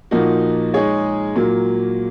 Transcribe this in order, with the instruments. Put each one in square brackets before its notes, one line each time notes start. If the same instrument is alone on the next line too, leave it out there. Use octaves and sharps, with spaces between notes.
[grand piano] A#2 F3 A#3 D#4 F#4
G#3 D#4 G#4 C#5
A#2 F#3 A#3